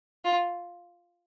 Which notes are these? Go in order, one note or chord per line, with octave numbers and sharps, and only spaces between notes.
F4